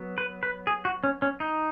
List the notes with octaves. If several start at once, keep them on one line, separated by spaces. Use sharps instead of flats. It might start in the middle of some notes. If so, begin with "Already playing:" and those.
Already playing: F#3 B3
B4
B4
G#4
F#4
C#4
C#4
D#4